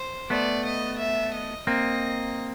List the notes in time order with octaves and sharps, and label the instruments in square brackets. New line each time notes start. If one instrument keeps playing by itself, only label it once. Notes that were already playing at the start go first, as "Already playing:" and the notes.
Already playing: [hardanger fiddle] C5
[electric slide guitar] A3 B3 [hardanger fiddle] D5
[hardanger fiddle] D#5
E5
D#5
[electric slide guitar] A#3 C4 [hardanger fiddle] D#5